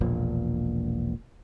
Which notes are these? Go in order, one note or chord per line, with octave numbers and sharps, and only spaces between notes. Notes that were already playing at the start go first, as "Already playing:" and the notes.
E1 A#1 A#2